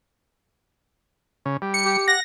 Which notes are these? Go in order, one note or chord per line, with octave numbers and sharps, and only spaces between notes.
C#3
G3
C#7
G4
F#5 A#6